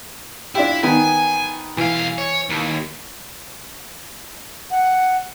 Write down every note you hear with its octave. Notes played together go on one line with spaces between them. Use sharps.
D4 E4 F4 G4
D#3 B3 G#5
B1 E3 F5
C#5
D#2
F#5